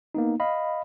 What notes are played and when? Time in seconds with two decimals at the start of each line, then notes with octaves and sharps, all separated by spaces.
0.15 A#3 B3 D#4
0.40 D#5 F5 B5